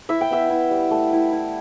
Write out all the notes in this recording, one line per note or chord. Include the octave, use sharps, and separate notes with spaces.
E4 E5
G5
B3 E5
E4
G3
A3
E4
E4